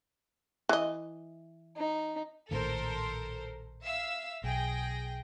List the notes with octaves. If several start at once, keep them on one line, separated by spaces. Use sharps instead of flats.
E3 D#5
D#4
A#1 A2 D#3 A4 A#4 C5
E5 F5 E6
B1 G#4 G5 A#6